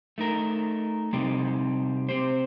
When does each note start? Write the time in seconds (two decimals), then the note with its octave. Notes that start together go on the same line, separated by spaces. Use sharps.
0.18 A3 D#4 A#4
1.13 C3 G3 C4 D#4 G4
2.09 C4 G4 C5